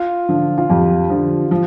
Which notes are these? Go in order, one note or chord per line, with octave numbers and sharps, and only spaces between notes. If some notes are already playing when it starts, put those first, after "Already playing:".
Already playing: F4
D3 F3
F4
F2 G4
D3 F3
F3 F4